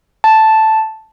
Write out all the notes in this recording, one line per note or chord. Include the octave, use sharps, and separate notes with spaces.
A5